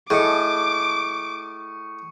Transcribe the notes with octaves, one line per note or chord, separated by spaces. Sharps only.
A2 G#4 A4 D#5 C#6 D6 C#7